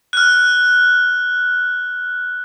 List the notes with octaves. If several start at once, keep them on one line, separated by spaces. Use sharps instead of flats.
F6 F#6